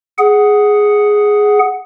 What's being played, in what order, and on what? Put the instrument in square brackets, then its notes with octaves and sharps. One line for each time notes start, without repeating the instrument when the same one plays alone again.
[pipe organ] G#4 F#5